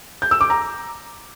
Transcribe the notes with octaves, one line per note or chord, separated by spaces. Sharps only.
G6
E6
D6
A#5